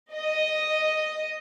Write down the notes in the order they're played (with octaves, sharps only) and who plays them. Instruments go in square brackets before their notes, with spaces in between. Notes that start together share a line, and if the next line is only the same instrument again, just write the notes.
[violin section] D#5